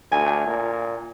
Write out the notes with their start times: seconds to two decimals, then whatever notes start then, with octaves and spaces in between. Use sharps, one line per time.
0.12 D2 G#5
0.47 A#2